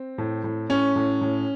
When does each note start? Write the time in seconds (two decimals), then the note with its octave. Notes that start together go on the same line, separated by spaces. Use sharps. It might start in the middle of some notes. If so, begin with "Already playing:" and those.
Already playing: C4
0.18 A2
0.44 A2
0.69 A2 C#4
0.96 A2
1.21 A2